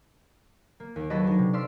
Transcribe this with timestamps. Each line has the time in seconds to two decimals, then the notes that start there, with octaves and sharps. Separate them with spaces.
0.80 A#3
0.96 D#2
1.10 F#3 A4 B4 D#5
1.24 F#3 D4 D#4
1.39 C3
1.53 D5 F5 C6 E6 B6